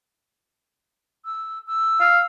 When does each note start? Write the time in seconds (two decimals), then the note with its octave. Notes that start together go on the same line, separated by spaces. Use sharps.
1.25 E6
1.67 E6
2.01 F5